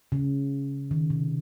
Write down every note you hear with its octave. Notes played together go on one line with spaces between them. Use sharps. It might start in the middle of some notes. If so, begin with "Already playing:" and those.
C#3
D#3
C3